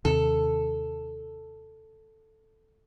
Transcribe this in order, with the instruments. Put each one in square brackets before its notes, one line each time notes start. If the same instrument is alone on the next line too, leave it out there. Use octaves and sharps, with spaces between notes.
[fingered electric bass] D#2 C3 [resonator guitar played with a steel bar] A4